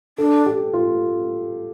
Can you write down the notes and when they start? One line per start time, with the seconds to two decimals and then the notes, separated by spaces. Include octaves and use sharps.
0.18 D4 A4
0.46 G4
0.73 F4